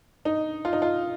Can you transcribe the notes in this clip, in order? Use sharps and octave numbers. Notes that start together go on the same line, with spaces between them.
D#4
F4
D#4
F4